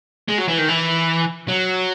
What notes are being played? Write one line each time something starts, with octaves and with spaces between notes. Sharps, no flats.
G#3
F#3
E3
D#3
E3
F#3